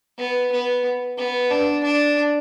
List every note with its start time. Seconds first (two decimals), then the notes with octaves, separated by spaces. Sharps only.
0.18 B3
0.52 B3
1.17 B3
1.51 D4
1.84 D4